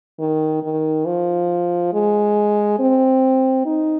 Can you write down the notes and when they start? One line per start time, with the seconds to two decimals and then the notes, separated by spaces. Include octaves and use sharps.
0.19 D#3
0.63 D#3
1.06 F3
1.93 G#3
2.80 C4
3.66 D#4